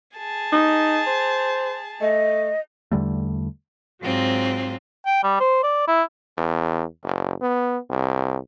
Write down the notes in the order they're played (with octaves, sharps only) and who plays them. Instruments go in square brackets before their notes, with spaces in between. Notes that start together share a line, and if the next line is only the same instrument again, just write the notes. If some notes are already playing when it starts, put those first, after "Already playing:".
[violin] G#4 A5
[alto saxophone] D#4
C5
[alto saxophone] A3 [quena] D#5
[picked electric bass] E2 D3 G3 A3
[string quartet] G#2 F#3 C4 F4
[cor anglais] G5
G3
C5
D5
E4
[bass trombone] E2
F#1
B3
C2